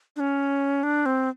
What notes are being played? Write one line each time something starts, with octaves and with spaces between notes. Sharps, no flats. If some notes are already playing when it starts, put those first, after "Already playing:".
D4
C#4
D4
C4